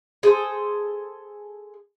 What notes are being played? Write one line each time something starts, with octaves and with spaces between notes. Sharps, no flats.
G#4 A4 C5